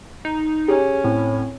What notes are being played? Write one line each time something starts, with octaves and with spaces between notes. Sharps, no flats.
D#4
C#4 G4 G#4
A2 C4